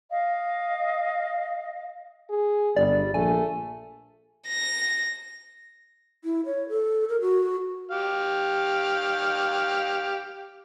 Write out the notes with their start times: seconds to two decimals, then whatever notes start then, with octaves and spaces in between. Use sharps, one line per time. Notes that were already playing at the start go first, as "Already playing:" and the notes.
0.10 D#5 F5
2.30 G#4
2.76 G1 G3 D5
3.14 A#1 A3 G#5
4.47 A#6
6.24 E4
6.46 C#5
6.69 A4
7.09 A#4
7.21 F#4
7.91 G4 F5